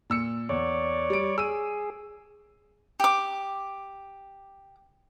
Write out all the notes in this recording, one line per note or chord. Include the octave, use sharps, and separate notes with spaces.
A#2 E6 C#7
E2 C#5 D5
G3 D7
G#4 E6 D#7
G4 D6